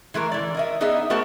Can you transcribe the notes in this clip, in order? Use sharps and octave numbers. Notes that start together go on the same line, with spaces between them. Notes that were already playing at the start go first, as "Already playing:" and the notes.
E3 G#3 A3 A#4
E3 D5
A#4 D#5 E5
B3 D#4 G#4 D#5 E5
A3 B3 F#4 A#4 C5 A5